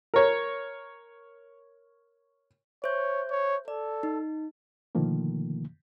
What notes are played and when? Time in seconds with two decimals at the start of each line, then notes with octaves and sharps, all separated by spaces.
0.14 A#4 C#5
2.84 C5 C#5 E5 G6
3.31 C#5
3.68 A4 D5
4.03 D#4
4.95 B2 D3 D#3 F3 A3 A#3